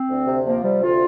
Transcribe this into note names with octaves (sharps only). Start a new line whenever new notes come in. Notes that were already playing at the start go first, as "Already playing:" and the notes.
Already playing: C4
D2
C3
F3 A#3
C3 G3
D2 F4